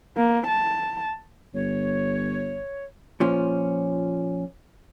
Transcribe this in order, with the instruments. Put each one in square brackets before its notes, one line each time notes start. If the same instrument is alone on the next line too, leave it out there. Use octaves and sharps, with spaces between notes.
[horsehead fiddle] A#3
A5
[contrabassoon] G1 [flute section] C#5
[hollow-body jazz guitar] A#2 F3 C#4